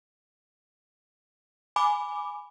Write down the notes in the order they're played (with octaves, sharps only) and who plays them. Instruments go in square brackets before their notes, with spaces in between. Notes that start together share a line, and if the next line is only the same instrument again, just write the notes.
[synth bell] G#5 B5 D6